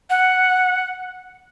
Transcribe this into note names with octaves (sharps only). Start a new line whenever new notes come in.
F#5